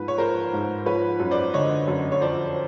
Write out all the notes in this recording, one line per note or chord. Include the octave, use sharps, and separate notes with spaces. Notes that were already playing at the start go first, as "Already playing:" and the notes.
Already playing: G#2 F3 B4
C#5
F3 A#4 C5
G#2
F3 B4 C#5
F#2
C5 D5
D3 C#5 D#5
F#2
C#5
F2 C5 D5